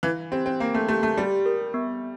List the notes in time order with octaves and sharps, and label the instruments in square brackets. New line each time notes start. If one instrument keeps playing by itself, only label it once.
[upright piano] E3 [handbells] F5
[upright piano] C4 [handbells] G4
[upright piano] C4
[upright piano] A#3 [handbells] F5
[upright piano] A3
[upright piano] A3 [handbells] G4
[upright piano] A3
[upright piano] G3 [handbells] G4
[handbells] A#4
B3